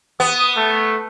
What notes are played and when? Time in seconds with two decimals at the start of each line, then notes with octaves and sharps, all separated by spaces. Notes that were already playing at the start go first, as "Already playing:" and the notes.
0.20 B3 D#6
0.56 A3